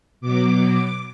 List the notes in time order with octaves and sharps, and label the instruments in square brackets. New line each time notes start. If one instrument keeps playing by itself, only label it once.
[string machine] B2 F#3 D6